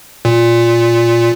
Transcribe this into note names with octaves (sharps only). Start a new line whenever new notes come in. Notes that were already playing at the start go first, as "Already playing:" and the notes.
A#2